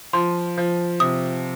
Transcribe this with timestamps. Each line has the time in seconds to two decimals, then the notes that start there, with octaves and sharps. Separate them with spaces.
0.13 F3 C6
0.57 F3
1.00 C3 D#6